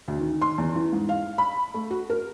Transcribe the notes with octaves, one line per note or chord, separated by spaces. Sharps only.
D2
D#3
C6
E2
E3
G#2
F5
B5
A3
F#4
A#4